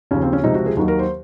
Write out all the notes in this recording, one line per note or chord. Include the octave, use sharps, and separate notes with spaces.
D#2 C#3 F3 C#4
C4
C#4
C#2 C3 F3 D#4
F#4
G#4
D#2 D#3 F#3
A#4
C5